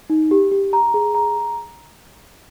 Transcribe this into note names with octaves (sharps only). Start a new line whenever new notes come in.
D#4
G4
G4
A#5
G#4
A#5